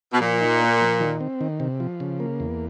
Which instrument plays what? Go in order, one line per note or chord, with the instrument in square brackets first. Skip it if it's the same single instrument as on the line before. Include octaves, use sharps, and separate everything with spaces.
[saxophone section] B2
[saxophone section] A#2 [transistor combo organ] F3
[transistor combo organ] D#4
A#3
F3
D#3
C4
D#3
C3
F3
C#3
A#3
E2